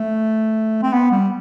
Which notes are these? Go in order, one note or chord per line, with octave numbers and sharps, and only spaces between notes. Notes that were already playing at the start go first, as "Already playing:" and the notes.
Already playing: A3
C4
B3
G3